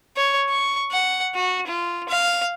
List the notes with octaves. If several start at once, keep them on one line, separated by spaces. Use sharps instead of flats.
C#5
C#6
F#5
F#4
F4
F5